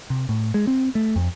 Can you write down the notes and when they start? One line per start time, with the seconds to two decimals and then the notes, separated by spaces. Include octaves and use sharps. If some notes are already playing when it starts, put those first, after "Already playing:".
0.10 C3
0.29 A2
0.54 G#3
0.67 C4
0.95 A3
1.16 F2